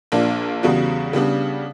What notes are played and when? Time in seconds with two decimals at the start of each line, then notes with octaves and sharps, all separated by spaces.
0.12 A#1 A#2 A#3 D4
0.63 E2 C#3 G3 B3 F#4
1.13 C#3 G3 B3 D4